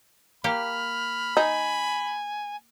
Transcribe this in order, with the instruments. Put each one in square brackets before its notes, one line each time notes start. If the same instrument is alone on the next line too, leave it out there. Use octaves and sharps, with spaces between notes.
[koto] A#3 G4 [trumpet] B5 [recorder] F6
[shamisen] D#4 [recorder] G#5